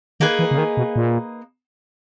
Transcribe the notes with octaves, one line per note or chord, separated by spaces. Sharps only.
D#3 A#3 D#4 G#4 B4
E3
C#3
D#3
B2
A#2